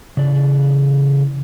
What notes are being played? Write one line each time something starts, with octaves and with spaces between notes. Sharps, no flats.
C#3 E3 D5